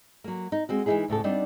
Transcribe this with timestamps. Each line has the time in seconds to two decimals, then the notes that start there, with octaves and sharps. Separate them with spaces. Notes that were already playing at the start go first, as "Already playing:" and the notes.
0.24 F#3 A#3
0.52 D#4
0.69 G#3 C4 F#4
0.86 E3 G#3 A#3 D#4 E4 G#4
1.08 D2 A2 C#3 A4
1.24 G3 B3 C4 D4 D#4